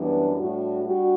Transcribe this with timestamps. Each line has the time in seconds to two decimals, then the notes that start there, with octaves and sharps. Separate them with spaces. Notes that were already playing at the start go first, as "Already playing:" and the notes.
Already playing: F#2 E3 G3 B3 D4
0.37 A2 G3 D4 F#4
0.85 G3 D4 F#4